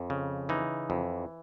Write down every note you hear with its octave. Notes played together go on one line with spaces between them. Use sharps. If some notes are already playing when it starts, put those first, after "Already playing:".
Already playing: F2
C#3
E3 D#4
F2